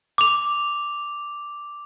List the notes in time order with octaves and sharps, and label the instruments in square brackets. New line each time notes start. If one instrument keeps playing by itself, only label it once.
[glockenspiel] D6 F7